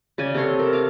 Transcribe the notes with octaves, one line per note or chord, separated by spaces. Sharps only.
C#3 D5 G#5
C3 A4 C#5 C6
A4 A#4
F5 D6